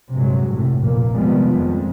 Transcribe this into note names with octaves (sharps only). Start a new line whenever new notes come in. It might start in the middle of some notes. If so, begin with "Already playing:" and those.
A#1 G2 C3 F#3 G#3
F#2 A2 C3
F1 B1 F2 A#2 A#3
C3 D#3 F3 G3 G#3 B3
F2 G#3